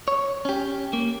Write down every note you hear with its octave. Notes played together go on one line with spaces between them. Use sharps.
C#5
C#4 G4
A#3